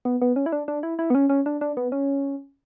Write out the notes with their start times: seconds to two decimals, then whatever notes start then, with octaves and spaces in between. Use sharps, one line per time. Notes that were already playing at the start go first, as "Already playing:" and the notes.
0.05 B3
0.21 B3
0.36 C#4
0.46 E4
0.52 D4
0.68 D4
0.83 E4
0.99 E4
1.10 B3
1.15 C#4
1.30 C#4
1.46 D4
1.61 D4
1.77 B3
1.92 C#4